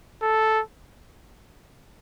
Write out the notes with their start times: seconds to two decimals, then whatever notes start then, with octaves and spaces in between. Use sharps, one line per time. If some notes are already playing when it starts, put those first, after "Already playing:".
0.22 A4